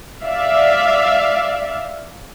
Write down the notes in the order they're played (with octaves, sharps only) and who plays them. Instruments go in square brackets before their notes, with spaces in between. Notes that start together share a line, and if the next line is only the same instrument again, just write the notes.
[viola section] D5 E5 F5